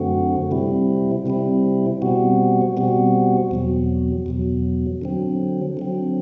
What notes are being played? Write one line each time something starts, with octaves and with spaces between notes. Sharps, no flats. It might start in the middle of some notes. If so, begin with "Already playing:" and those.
Already playing: F#2 D3 A3 C4 F#4
C3 G3 C4 E4
C3 G3 C4 E4
B2 G3 C4 F#4
B2 G3 C4 F#4
E2 B2 F#3
E2 B2 F#3
D3 F#3 C4
D3 F#3 C4